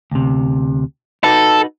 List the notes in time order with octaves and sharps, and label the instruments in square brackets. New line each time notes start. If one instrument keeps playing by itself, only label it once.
[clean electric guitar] D2 C3
[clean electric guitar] D#4 F#4 B4 [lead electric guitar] A4